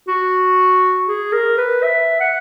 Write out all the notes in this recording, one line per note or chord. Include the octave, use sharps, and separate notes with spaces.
F#4
G#4
A#4
B4
E5
F#5